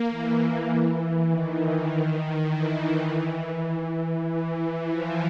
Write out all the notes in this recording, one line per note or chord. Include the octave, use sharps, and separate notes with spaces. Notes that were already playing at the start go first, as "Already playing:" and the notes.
Already playing: A#3
E3
E3
D#3
E3
E3
F3